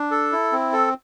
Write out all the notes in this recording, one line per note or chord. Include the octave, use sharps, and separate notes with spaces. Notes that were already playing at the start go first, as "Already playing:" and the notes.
Already playing: D4
A4
E4
C4
A4